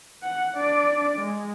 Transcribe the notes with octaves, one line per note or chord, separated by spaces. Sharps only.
F#5
D4 D5
G#3